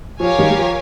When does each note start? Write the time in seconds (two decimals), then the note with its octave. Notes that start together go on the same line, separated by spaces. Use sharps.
0.19 F3 G4 A#4 C#5 F5 G#5
0.39 D#3 G3
0.50 G3
0.58 F3